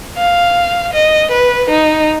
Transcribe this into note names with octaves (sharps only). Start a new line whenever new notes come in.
F5
D#5
B4
D#4